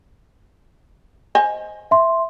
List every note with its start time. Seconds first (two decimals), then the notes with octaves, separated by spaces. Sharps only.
1.35 C5 D#5 G#5
1.91 E5 C6